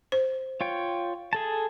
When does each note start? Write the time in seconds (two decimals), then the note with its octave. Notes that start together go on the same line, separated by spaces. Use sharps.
0.12 C5
0.61 F4 C#5 G5
1.33 G#4 A4 A5